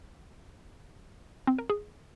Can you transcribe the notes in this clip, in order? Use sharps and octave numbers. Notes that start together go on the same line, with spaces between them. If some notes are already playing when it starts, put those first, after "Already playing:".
C4
A#4
G#4